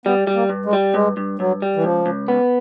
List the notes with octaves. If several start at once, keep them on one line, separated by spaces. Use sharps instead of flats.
G3 B3
G3
A#3
G2
G#3
G3
G2 G#3
G2
G2 F#3
G3
E3
C#2 F3
C#2
B3